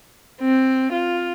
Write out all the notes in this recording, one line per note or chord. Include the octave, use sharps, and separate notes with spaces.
C4
F4